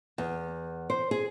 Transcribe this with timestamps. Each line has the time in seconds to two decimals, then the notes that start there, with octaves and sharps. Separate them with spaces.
0.18 E2
0.90 C5
1.11 G#4